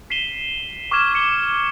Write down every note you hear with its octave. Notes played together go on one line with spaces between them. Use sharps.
B6 C7 D#7 E7 G7
C#6 D6 F6 G#6 E7
C#7 G7